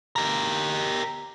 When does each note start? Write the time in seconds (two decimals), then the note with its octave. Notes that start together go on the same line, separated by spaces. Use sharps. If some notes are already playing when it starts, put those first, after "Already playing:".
0.16 G4 A#4